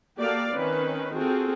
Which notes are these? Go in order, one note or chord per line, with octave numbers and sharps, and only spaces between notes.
A#3 F#4 G4 A4 D5 F5
D#3 C4 C#4 B4
C4 F4 F#4 G#4 A4